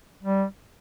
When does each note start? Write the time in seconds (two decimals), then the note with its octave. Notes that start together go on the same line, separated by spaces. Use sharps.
0.23 G3